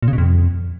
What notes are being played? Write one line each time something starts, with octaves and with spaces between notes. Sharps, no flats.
A#2
C#3
B2
F2